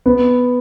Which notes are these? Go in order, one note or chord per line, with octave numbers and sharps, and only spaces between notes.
B3